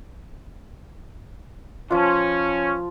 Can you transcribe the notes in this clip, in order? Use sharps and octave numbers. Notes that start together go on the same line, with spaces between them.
F3 C#4 F4